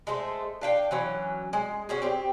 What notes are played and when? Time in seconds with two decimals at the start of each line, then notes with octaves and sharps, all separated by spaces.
0.07 G#3 A3 A4 C5
0.61 D4 F5 G5
0.91 E3 F#3 C#4
1.53 G#3
1.89 C#4 F#4 G#4
2.02 C4 G4